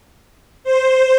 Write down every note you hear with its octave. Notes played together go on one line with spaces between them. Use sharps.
C5